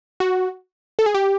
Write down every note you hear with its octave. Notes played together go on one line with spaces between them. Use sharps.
F#4
A4
G#4
G4